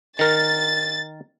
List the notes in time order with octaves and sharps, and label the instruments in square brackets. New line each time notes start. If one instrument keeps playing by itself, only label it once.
[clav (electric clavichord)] D#3 A#4 [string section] A6